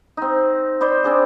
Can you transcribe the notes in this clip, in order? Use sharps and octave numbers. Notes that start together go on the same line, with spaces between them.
C4 D#4
C5 D5 D#5 B5
C4 D4 G#4